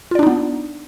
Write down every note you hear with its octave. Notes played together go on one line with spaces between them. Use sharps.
B3 D4 D#4 F4 D5